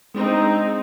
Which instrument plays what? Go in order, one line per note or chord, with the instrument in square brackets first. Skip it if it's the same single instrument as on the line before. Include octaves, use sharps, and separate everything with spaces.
[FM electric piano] G#3 D4 G#4 [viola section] C4 D#4